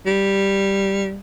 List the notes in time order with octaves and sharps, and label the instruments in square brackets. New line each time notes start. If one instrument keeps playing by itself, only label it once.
[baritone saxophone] G3